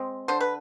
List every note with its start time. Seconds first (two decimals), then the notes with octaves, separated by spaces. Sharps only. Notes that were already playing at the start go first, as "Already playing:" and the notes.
Already playing: G#3 C4
0.28 D3 C5
0.40 B4